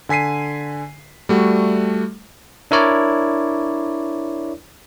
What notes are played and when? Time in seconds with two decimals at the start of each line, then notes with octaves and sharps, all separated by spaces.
0.09 D3 G#5 B6 C7 D#7
1.29 G3 A3 F#4
2.71 D4 E4 A#4 C#5 D5